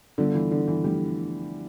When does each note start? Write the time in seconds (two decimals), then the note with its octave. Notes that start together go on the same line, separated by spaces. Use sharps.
0.18 D3 G3 B3 F4 A4
0.34 E3
0.51 D3
0.68 E3
0.84 F3 G3 A3 D4